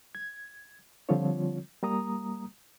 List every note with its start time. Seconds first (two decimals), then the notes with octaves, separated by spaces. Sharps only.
0.15 G#6
1.09 D3 F3 G3 C4 F4 C#5
1.83 G3 A#3 A#5 D#6